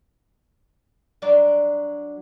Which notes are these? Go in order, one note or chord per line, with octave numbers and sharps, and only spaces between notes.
F#3 D4 D5